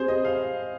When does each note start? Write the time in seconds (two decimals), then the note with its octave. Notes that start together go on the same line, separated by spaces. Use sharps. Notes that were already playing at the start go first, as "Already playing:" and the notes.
Already playing: C4 G4 G#4 C5
0.08 D#5
0.25 F5